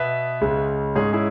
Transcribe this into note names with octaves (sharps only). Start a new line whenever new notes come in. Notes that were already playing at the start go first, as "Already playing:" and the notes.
Already playing: B2 B3 B4 E5
C#2 C#3 G#3
G#2 G#3 C#4 G#4 C#5
E4 G#4